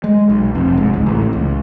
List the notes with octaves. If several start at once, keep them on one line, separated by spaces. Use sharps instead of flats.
G#3
B1
F1
G#2
C#2
A1
C#2